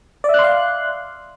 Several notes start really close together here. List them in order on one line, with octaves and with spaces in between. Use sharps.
D5 E5 F#6 C6 F5